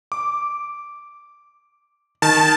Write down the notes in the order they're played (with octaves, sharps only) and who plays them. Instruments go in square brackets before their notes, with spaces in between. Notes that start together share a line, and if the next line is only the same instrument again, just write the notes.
[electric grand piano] D6
[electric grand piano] D#3 [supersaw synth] A5